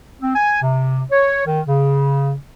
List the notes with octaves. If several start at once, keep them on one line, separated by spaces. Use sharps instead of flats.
C4
G#5
C3
C#5
D#3
C#3